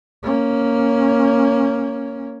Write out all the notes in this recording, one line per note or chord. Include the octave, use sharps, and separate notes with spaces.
A#3 C#4